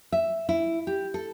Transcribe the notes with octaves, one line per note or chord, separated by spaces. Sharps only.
E5
E4
G4
A4